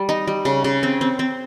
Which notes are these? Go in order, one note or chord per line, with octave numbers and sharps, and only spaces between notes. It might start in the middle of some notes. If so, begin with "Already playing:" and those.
Already playing: G3
D#4
G3
C#3
C#3
C4
C4
C4